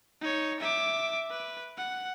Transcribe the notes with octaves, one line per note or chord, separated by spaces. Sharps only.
D#4 C#5
E5 D6
B4
F#5